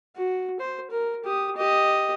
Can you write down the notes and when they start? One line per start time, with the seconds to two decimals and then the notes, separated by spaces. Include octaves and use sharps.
0.16 F#4
0.60 C5
0.91 A#4
1.24 G4 D#6
1.56 G4 D#5